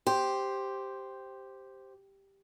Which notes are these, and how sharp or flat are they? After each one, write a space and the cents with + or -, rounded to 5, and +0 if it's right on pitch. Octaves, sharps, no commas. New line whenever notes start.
G4 +0 C5 +0